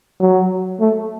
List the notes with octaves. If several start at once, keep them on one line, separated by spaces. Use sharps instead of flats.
F#3
A3